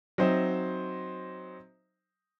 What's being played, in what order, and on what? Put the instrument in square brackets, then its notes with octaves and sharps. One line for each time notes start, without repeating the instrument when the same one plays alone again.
[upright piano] F#3 C4 D#4 C5 D#5 E5